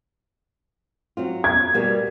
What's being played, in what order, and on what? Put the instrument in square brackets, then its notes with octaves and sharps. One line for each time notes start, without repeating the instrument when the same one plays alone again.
[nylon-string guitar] F#3 C4 F4
[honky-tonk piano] G#6
[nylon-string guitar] B2 G3 A#3